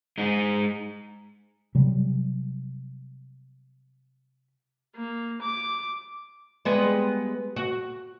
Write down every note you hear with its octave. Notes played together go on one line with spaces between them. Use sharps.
G#3 D#4
C3 F#3 G3
A#3
D6
G3 G#3 B3
F#4